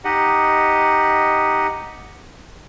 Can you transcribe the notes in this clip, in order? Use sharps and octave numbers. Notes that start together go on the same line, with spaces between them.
D#4 G4 D#5 F#5